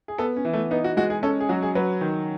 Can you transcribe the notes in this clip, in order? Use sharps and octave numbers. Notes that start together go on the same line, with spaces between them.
G#4
B3 A4
C#4
E3
A3
B3 D#4
F#4
G#3 F#4
G#4
C#4 A4
G#4
F#3 F#4
G#4
F#3 B4
D#3